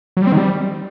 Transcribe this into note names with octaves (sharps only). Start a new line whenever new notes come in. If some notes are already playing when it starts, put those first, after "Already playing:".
F#3
G3
C4
D#3
G3